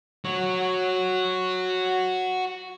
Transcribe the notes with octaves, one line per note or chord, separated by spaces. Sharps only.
F#4 C#5